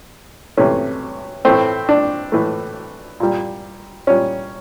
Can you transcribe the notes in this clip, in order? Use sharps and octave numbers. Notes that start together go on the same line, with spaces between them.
C3 E3 A3 C#4
A2 E3 A3 C4
D4
A2 E3 A3
A#2 G3
A#2 G3 C#4